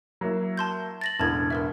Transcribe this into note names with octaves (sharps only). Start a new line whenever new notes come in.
F#3 A#3 E4
A5 C6 G6
A6 A#6 F#7
E1 A1 D3 A5 G#6
A#4 B4 E5